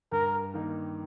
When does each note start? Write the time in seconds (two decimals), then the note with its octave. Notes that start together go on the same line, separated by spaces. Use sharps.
0.12 G2 A#4
0.54 D#3 A#3 D#4